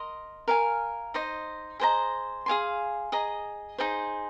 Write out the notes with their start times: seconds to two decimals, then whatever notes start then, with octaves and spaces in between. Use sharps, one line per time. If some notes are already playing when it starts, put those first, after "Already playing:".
Already playing: A#4 D#5 C6 D#6
0.48 A#4 F5 G#5
1.14 D#4 C5 D#5
1.80 G#4 C5 D#5 A#5
2.46 G#4 F5 G#5 C6
3.12 G#4 D#5 A#5
3.78 D#4 G#4 C5